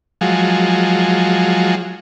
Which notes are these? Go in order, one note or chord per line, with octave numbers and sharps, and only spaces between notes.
F3 F#3 G#3